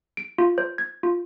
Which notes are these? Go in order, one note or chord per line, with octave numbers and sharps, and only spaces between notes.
D7
F4
C5
G#6
F4